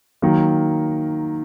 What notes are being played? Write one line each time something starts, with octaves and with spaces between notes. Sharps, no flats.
D#3 F#3 A#3